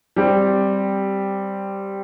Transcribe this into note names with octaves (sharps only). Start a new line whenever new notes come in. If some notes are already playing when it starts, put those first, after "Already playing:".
G3 C4 G4